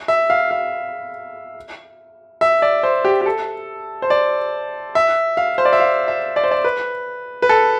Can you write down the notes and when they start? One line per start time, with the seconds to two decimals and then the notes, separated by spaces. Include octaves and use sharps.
0.08 E5
0.30 F5
0.51 F5
2.41 E5
2.62 D5
2.83 C5
3.05 G4
3.21 G4
3.26 A4
4.02 C5
4.10 D5
4.95 E5
5.37 F5
5.58 C5
5.65 D5
5.73 E5
5.80 F5
6.08 E5
6.36 D5
6.44 C5
6.51 D5
6.64 B4
7.42 B4
7.49 A4